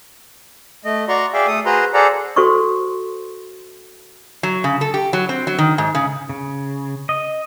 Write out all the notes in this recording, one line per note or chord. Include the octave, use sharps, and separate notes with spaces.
A3 D#5
F#4 D5 A#5 C6 C#6
G#4 D5 E5 F5 G5
A3 A4 D#6
F#4 G#4 B4 C5 A#5 C6
G#4 A4 C5 D5 F#5 A#5
F#4 A4 C5 C6 C#6 D#6
F#3
C#3
A4
G4
F#3
C4
F#3
D#3
G#2
C#3
C#3
D#5